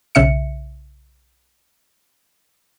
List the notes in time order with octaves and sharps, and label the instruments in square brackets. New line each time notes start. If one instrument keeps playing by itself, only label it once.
[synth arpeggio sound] B1 C#3 E5 C#7